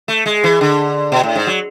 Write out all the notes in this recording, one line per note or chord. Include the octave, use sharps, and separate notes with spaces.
A3
G#3
E3
D3
B2
A2
G#2
F#3